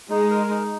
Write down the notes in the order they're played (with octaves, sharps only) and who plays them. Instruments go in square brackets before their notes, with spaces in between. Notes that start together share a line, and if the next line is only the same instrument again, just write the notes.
[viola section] G#3 [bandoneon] D#4
[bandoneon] A#4
D#4